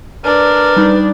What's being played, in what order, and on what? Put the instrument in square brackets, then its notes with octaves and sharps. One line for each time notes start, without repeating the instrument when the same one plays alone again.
[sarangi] D4 [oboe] A#4 [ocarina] B4
[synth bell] G3 D#4